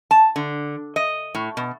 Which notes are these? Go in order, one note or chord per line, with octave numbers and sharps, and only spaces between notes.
A5
D3
D#5
A2
B2